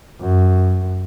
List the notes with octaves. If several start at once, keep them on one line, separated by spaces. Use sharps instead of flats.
F#2